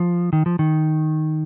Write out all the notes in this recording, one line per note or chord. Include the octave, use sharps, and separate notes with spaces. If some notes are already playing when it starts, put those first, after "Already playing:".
Already playing: F3
D#3
F3
D#3